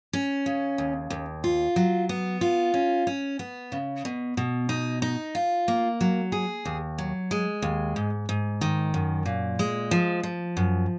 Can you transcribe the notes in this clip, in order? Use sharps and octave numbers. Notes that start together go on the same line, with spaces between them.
C#4
C#3
D#2
D#2
F4
F#3
B3
F4
C#4
C#4
B3
C#3
B2
B2
D#4
D#4
F4
A#3
F#3
G#4
D#2
F#3
G#3
D#2
G#2
G#2
D#3
F#2
A#2
G#3
F3
F3
F#2